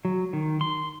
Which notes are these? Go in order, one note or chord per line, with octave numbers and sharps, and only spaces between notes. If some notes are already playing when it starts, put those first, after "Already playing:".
F#3
D#3
C6